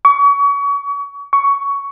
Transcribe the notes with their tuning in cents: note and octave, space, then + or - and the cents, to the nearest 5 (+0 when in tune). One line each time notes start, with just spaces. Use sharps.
C#6 +35
C#6 +15